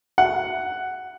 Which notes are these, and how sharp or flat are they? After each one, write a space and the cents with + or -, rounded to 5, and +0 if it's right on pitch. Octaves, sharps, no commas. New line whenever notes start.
F#5 +5